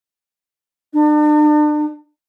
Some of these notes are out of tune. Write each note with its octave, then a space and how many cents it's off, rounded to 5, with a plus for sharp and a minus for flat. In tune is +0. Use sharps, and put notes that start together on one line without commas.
D4 +40